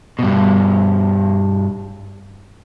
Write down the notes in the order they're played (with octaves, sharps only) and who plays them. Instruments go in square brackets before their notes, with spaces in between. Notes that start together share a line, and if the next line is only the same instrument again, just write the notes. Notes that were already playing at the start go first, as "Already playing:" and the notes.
[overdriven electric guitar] G2 B2